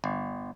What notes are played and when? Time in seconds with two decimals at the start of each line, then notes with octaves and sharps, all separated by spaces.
0.04 G1